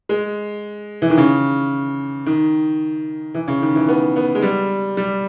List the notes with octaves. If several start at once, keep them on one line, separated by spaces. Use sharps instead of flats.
G#3
E3
D#3
C#3
D#3
E3
C#3
D#3
E3
B3
B3
G#3
G3
G3